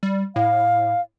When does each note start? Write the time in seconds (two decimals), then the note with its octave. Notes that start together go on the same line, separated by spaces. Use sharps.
0.03 G3
0.36 A2 F5